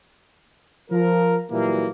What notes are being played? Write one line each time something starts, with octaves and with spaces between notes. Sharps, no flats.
F3 A#4
A#2 E3 F#3 G3 A#3